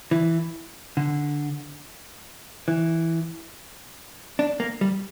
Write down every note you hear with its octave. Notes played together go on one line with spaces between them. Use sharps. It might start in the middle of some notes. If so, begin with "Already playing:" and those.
E3
D3
E3
D4
A#3
G3